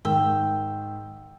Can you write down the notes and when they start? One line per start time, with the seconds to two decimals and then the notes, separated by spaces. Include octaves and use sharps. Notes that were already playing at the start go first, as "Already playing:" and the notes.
0.05 G#2 D#3 G5 E6